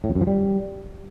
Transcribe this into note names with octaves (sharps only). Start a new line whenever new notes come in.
A2
F2
F#2
F3
G3